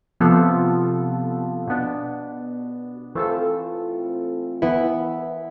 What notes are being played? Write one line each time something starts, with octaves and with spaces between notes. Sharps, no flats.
C3 F3 B3 F4 A4
B2 B3 D4
E3 A3 C4 F4 A4
E3 B3 E4